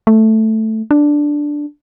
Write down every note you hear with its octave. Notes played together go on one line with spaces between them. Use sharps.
A3
D4